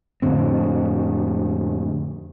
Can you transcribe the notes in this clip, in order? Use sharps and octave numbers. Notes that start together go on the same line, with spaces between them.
F2 A2 D3 C4